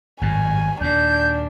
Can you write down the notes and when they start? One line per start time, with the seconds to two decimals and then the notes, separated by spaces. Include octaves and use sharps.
0.21 G#1 F#2 A2 G#5
0.81 D#2 A#2 D4 G6